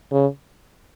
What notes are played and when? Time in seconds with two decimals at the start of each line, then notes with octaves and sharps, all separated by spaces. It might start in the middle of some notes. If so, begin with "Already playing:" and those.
0.12 C#3